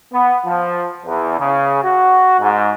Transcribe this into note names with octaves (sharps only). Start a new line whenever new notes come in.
B3
F3
E2
C#3
F#4
G#2